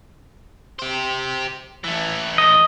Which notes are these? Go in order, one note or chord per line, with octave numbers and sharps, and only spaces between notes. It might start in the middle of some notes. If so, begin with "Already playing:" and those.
G4 C5
E3 A3
D#5